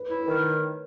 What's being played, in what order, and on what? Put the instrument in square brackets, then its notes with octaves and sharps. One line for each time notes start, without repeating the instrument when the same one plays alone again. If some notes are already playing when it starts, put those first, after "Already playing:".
Already playing: [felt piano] B4
[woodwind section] E4 [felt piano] C#5
[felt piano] B4
[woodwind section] D#3 [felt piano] C#5